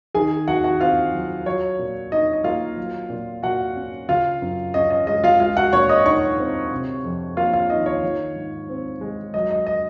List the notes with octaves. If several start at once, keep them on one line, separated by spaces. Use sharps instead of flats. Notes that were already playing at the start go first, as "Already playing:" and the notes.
D#3 G#4 G#5
D#2 F#4 F#5
F#4 F#5
C4 F4 F5
F#3
F#3 C#5
A#2
D#4 D#5
D#5
A#3 F4 F5
F#3
A#2
A#2 F#4 F#5
C#4
C#3 F4 F5
F#2
C#4 D#5
D#5
G#3 D#5
F4 F5
G#3 F4 F5
F#4 F#5
A#2 C#5 C#6
D#5 D#6
D#4 C#5 C#6
C4
C3
F2
A#3 F4 F5
F4 F5
D#3 D#5
C#5
D#3
G#2
C4
G#3
F#3 D#5
D#5
D#5